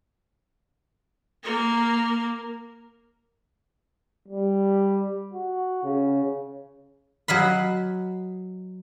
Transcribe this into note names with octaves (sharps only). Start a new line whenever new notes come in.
A#3 A#4
G3
F#4
C#3
F#3 D#5 F5 B5